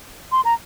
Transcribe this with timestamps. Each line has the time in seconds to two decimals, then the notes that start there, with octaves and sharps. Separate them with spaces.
0.32 C6
0.45 A#5